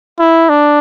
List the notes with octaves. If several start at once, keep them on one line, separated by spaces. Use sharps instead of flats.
E4
D4